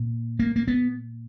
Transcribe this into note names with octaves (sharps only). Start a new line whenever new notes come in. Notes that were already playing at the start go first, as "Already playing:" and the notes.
Already playing: A#2
A#3
A#3
B3